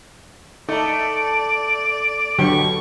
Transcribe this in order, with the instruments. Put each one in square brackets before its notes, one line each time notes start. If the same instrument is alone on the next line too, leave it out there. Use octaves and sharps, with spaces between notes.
[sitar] A3 [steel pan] D#4 [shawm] D5
[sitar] B2 [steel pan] D3 F#3 G4 [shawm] C#6